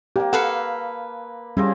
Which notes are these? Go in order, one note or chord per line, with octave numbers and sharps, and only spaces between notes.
A#3 G4 G5
A4 B4 F5 F#5
F3 G3 C4 C#4 E4 G#4